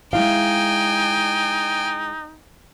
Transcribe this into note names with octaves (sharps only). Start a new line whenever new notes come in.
G#3 D#4 E4 F5 G5 G#5